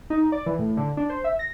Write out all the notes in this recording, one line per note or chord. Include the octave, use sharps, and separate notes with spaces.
D#4
D5
E3
A2
D3
D4
C5
E5
A#6